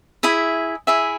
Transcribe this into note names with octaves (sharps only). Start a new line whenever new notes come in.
E4 G#4 E5
E4 G#4 E5